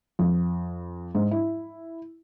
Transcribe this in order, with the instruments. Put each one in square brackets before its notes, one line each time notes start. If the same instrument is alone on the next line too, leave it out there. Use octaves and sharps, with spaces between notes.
[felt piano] F2
G#2
E4